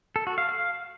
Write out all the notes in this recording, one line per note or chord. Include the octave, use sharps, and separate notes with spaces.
A4
F#4
F5
F5